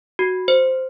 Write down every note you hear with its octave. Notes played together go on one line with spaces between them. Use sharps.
F#4
C5